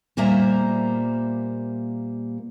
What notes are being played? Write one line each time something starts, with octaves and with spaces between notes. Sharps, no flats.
A#2 G3 A#3 C5 E5 A#5